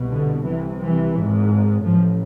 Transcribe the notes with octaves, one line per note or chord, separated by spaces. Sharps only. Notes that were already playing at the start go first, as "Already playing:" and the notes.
Already playing: C2 B2
D3
C2 C3 E3
E3
G#1 G#2
A1 A2 F3